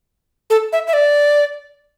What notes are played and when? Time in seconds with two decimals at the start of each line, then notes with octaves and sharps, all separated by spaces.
0.50 A4
0.73 E5
0.87 E5
0.93 D5